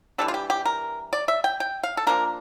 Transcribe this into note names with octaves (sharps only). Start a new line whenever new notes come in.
E3 G3 D4 A4
F4
G4
G4
A#4
D5
E5
G5
G5
F5
A4
F3 A#3 D4 A#4